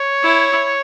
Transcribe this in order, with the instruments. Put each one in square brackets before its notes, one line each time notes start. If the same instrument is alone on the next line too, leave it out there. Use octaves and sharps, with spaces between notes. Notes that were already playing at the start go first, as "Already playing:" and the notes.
Already playing: [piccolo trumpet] C#5
[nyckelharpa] E4